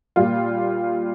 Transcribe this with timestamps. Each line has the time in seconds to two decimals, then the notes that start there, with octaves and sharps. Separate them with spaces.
0.16 A#2 G3 F4